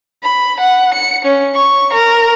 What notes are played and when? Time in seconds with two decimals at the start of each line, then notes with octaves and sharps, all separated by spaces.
0.24 B5
0.60 F#5
0.94 C#7
1.25 C#4
1.55 C#6
1.93 A#4